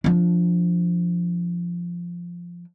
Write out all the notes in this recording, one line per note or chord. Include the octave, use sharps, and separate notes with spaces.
F3 D4